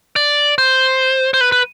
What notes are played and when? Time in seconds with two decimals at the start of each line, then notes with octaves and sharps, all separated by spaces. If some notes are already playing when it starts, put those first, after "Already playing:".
0.16 D5
0.58 C5
1.34 C5
1.41 B4
1.52 B4